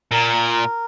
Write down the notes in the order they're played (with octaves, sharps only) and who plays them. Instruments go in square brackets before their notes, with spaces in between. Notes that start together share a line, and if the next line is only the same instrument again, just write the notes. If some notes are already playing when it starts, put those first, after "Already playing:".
[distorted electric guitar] A#2 [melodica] A#4